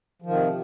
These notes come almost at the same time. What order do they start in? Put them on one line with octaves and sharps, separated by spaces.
F3 D#3 C3